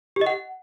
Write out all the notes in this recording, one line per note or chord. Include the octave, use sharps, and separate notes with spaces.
G4
D#5
F#5